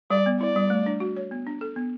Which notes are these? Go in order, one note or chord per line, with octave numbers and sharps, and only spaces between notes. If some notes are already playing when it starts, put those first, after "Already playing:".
G3 D5
B3
E4 D5
G3
A3
D4
F#4
C#5
B3
D4
A4
B3